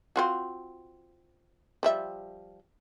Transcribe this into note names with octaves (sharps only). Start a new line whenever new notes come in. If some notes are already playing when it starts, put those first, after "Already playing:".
C4 F4 F#4
F3 G3 E5